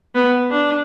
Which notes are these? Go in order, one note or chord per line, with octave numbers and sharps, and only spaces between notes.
B3
D4